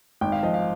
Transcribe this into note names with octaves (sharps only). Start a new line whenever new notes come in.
G#1 G5
F5
F3 D#5
F5